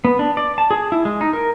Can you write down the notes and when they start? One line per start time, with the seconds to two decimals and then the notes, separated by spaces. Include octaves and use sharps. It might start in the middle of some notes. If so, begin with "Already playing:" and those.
0.05 B3
0.19 D4
0.37 D5
0.58 A5
0.71 G#4
0.92 E4
1.05 G#3
1.21 D#4
1.33 A#4